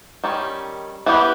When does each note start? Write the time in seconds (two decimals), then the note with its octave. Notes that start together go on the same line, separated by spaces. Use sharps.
0.24 D#3 G3 C#4
1.06 E3 G3 B3 G4